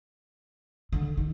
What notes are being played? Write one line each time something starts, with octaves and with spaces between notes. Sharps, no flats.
D3
D#3